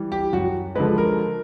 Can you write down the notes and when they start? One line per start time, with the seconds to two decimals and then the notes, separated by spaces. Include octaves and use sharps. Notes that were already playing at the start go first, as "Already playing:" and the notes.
Already playing: E3 G3
0.12 G4
0.33 F#2 F#4
0.75 D3 F3 G#3 B4
0.98 A#4